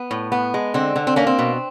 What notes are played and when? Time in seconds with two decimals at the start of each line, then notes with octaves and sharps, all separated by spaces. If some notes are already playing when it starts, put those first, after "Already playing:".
Already playing: B3
0.11 A2
0.32 B3
0.54 G#3
0.74 D3 C4
0.96 D3
1.07 C4
1.16 A#3 C#4
1.27 C4
1.38 B2